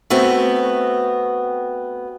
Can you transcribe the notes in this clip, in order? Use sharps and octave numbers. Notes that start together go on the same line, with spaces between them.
A3 B3 C4 F#4